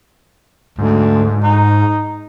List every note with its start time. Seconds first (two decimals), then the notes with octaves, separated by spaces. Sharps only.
0.78 D2 G#2
1.43 D#4